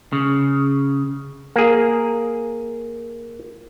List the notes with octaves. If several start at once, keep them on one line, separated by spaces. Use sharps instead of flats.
C#3
A#3 G#4